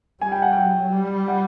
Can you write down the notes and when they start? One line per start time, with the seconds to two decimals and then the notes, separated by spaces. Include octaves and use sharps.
0.21 G3 G#5
0.32 G5
0.42 F#5
0.53 F#3 G5
0.92 G3
1.28 F#5